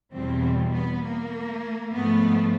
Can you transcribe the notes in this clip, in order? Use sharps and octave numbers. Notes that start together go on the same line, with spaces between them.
E2 B2 G3 C4
B3
A#3
G#2 F3 A3 B3